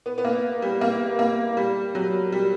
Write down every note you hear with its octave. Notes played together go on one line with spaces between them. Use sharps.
B3
B3
A#3
G3
A#3
A#3
G3
F#3
G3